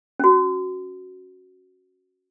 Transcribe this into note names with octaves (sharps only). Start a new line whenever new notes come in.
C#4 F#4